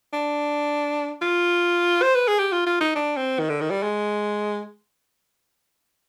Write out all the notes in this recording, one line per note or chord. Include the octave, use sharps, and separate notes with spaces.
D4
F4
C5
B4
G#4
G4
F4
F4
D#4
D4
C4
D#3
D3
D#3
G3
G#3